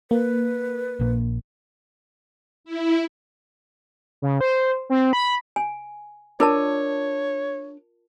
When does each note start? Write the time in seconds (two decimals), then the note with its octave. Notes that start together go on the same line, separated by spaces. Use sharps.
0.11 A#3 B4
1.00 A#1 A#2
2.64 E4
4.22 C#3
4.41 C5
4.90 C4
5.13 B5
5.56 G#5
6.40 D4 F4 A#4 C#5 A5